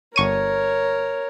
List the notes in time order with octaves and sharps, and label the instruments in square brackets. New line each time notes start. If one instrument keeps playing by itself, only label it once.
[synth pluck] G1 C#6 D#7 [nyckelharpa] A#4 C#5